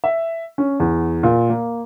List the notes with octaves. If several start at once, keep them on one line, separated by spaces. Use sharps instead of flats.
E5
C#4
E2
A#2
A#3